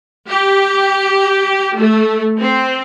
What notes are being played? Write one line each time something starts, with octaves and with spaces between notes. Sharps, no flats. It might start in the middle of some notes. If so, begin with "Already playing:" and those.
G4
A3
C4